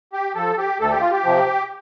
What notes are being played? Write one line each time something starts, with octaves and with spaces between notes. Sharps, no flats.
G4
F3 A4
G4
D2 A4
G4
F4
G4
C3 F3